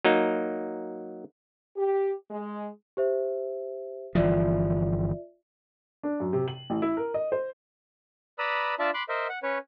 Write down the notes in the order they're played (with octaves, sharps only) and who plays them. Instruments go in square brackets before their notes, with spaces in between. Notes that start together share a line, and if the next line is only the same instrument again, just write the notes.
[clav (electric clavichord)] F#3 A#3 D#4
[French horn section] G4
G#3
[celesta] G4 C5 E5
[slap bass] G1 E3 F3 [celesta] F4 D5 E5
[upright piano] D4
F#2
C3
F#7
A1
E4
A#4
D#5
C5
[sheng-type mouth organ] B4 D5 A#5 B5 D#6 E6
D4 F4 D5 E5 A5
B5 C6 D6 F#6
A#4 C5 D#5 E5
F#5
C#4 B4 C#5